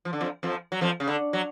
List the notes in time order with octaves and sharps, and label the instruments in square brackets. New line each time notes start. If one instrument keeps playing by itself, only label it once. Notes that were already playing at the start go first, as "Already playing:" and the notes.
[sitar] F3
D3
F2 F3
F2 F3
F#3
F2 F3
C#3
D3
F#3